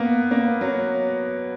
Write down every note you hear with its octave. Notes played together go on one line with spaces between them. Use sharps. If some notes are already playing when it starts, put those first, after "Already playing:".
Already playing: A#3 B3
A#3
F#3